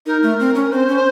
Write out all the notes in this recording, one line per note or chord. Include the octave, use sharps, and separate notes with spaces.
D#4 A#4
A3
C4
C#4
C4 C5
C#4